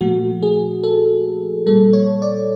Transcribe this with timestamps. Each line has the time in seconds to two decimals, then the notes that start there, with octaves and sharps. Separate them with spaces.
0.01 A#2 F3 A3 F#4
0.42 G#4
0.83 A4
1.66 A#2 G3 A4
1.93 C#5
2.22 D5